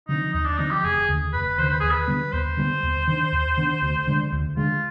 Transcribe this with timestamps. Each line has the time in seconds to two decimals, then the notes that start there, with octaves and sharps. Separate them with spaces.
0.08 D3 F3 C4 D#4
0.33 D#2 D#4
0.45 D4
0.58 D3 F3 C4 D#4
0.71 G4
0.83 F1 G#4
1.08 D#2 D3
1.33 F1 B4
1.58 D#2 D3 C5
1.69 B4
1.80 D#2 G#4
1.91 B4
2.08 D3 G3 B3
2.32 D#2 C5
2.57 D3 G3 B3
2.83 D#2
3.07 D#3 B3 D4
3.32 D#2
3.57 D#3 B3 D4
3.82 D2
4.07 D3 G#3 D4
4.32 D2
4.57 D3 G#3 D4 F4